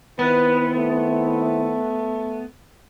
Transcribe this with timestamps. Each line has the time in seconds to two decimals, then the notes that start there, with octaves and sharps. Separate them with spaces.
0.19 D#3 B3 C4 E4 B4
0.76 A3